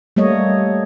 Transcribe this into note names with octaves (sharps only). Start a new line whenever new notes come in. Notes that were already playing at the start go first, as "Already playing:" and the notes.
G3 A3 A#3 C#5 D#5